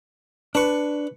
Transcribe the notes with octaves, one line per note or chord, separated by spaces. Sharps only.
D4 B4 C#6